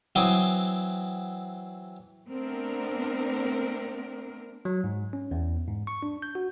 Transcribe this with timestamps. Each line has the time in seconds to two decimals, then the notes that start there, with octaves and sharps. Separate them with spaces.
0.15 E3 F#3 C4 C5 D6 D#6
2.28 A3 B3 C4 D4 A#4
4.65 F#3
4.84 G#2
5.13 C#4
5.31 E2
5.68 G#2
5.87 C#6
6.03 D4
6.22 G6
6.35 F#4